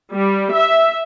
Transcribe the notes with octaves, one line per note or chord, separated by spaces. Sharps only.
G3
E5